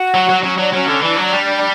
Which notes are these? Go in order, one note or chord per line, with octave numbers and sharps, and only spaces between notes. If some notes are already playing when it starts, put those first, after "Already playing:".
Already playing: F#4
F#3
F#3
F#3 C#4
F#3 D4
F#3 C#4
D3
E3 D4
F#3
G3